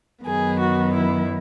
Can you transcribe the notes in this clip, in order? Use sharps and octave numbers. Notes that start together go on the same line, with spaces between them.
F#2 D#3 F#3 B3 G#4
F#4
E4